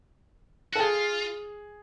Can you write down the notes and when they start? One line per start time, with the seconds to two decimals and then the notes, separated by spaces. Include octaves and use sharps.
0.73 F#4 A4
0.80 F4 G#4